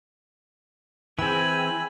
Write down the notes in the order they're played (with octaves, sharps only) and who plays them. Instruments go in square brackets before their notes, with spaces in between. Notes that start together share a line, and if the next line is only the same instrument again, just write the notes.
[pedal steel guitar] E3 C4 [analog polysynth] G#4 G5 E6 [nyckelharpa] G#5 B5